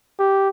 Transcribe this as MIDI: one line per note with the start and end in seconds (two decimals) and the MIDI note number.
0.19 0.49 67